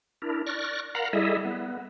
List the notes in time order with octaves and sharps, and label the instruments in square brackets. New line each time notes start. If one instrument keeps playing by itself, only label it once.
[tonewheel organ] D4 E4 A#4
D5 C#6 F6 F#6 A#6
A#4 F5 F#5 A#5 B5
G3 E4 G#4 A4 D#5 E5
B3